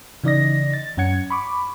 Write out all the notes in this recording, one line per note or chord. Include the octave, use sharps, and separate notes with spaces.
C#3 E3 D#4 D5 D#5 A#6
A6
F#2 C#4 F#5 G#6 C#7
B5 C#6 D6